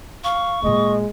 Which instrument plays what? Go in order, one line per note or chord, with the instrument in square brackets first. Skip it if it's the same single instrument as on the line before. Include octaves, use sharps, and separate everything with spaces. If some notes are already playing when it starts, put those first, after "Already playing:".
[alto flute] F5 [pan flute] C#6
[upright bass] A#2 A#3 [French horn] G#3 [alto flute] D#5